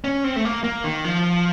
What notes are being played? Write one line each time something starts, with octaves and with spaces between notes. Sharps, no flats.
C#4
C4
A3
A#3
A#3
D#3
F3